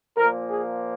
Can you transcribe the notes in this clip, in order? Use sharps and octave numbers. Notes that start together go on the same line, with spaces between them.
A#2 F3 A#3 A#4
G#4